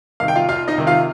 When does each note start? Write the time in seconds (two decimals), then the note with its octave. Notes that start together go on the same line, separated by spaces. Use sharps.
0.20 C3 D#3 F5
0.28 G5
0.36 F4 F5
0.49 C2 F4 F5
0.68 D#4 D#5
0.78 C3 D#3
0.87 F4 F5